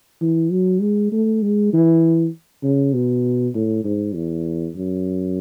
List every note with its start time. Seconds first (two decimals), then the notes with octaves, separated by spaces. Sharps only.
0.21 E3
0.51 F#3
0.81 G#3
1.12 A3
1.42 G#3
1.73 E3
2.63 C#3
2.93 B2
3.55 A2
3.84 G#2
4.14 E2
4.75 F#2